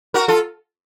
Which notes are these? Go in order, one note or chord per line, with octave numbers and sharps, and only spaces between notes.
F#4 A#4
F4 A4